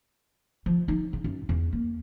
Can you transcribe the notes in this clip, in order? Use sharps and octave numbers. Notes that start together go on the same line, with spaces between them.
F3
D#4
C#3
F#2
E2
A#3